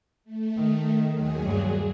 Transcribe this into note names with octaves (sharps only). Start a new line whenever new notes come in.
A3
D#3
D#2 F#3 G#4
G2